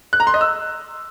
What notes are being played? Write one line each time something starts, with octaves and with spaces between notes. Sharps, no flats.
F#6
A#5
C6
D#5
E6